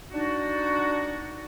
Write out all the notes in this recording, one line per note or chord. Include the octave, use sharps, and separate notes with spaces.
D4 D#4 F#4